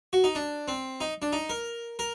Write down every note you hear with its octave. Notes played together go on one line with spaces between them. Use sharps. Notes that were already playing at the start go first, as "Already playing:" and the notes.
F#4
D#4
D4
C4
D#4
D4
D#4
A#4
A#4